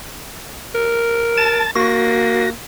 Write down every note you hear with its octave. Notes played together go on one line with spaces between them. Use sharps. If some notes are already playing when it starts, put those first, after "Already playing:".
A#4
A5 A6
A#3 F#4 A#6